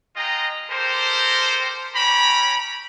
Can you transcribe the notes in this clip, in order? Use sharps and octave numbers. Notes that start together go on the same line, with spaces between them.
G#3 F4 D#5 G5 A#5
G4 A4 A#4 C5
C#4 G4 A#5 B5